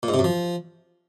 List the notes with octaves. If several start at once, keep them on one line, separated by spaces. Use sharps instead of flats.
A#2
G#2
C3
F#2
F3